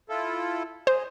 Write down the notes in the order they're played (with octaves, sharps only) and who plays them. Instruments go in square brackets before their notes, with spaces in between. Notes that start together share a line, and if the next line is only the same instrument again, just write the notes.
[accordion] E4 F4 A4
[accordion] G#4 D#5 [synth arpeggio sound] C5